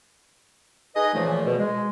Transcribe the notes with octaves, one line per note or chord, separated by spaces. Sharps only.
D#4 G#4 B4 D#5
A#2 C#3 E3 F3 A3
B2
G#3